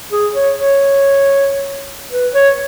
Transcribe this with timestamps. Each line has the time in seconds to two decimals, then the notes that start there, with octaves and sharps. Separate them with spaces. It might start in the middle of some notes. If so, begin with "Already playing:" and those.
0.12 G#4
0.34 C#5
0.56 C#5
2.12 B4
2.34 C#5